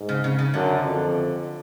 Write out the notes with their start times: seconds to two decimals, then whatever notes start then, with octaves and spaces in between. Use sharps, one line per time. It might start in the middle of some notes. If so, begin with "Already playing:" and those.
Already playing: G#2
0.09 C#3
0.24 C#3
0.39 C#3
0.54 F#2 D3
0.84 F2